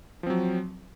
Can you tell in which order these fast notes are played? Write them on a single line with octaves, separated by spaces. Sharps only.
F3 C4 F#3